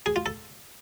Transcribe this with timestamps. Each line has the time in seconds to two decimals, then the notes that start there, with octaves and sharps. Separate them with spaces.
0.06 G#4
0.16 F4
0.26 A4